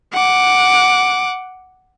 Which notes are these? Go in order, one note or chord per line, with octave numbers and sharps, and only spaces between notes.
F#5 D6